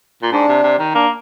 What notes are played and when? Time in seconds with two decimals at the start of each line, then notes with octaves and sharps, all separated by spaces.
0.22 A#2
0.32 G#2 D4
0.48 C3
0.63 C3
0.79 D#3
0.94 A#3 D4